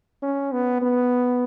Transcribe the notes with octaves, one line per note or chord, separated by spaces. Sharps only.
C#4
B3
B3